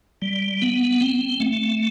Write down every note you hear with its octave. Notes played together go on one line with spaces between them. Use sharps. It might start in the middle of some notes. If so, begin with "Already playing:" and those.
G3
B3
C4
A3